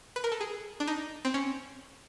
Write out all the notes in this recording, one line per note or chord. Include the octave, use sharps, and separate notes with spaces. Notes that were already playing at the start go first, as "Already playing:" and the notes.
B4
A#4
A4
G#4
D4
D#4
C4
C#4